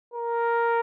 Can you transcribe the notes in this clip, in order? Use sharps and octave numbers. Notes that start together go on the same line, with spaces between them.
A#4